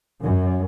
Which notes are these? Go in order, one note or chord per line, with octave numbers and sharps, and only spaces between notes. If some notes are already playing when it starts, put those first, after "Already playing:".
F#2